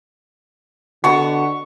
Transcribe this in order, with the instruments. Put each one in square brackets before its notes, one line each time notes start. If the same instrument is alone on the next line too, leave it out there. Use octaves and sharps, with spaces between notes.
[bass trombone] D3 [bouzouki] B3 F#4 [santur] C#6